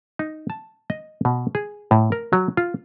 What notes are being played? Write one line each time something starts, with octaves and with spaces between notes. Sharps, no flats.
D#4
A5
D#5
B2
G#4
A2
A#4
F#3
F4